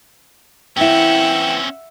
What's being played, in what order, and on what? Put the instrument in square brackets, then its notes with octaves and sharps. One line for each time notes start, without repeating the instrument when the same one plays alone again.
[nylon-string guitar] E3 E4 [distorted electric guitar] C4 C#4 [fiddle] E5 F#5 [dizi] G5